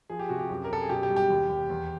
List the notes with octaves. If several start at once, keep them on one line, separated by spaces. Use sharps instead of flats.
F3 G#4
G4
C3 F#4
G4
F#2
A#4
F#2 A4
G#4
B2 G4
G4
G3
G4
D#2
D#2
E2